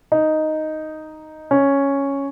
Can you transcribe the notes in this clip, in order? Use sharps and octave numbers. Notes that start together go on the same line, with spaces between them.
D#4
C#4